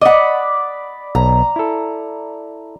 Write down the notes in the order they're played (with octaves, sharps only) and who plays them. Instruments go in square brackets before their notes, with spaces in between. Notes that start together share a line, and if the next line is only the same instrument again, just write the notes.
[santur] D5 B5 [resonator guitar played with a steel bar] D#5 F#5
[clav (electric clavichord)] B1 [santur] A#5
[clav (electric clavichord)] E4 A4